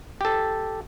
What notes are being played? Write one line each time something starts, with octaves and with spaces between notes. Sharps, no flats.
G4 A4